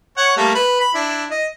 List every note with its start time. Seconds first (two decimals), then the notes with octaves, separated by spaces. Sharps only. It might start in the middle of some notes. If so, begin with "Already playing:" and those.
0.17 C#5 F#5
0.37 G3 A3 A#3
0.55 B4 B5
0.80 B5
0.94 D4 E4
1.31 D#5